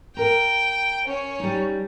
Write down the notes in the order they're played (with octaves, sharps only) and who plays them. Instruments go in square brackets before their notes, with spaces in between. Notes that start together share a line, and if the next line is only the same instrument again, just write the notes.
[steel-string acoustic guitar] A#4 A#5 [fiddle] G5
[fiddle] C#4 C#5
[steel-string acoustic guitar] G3 D#4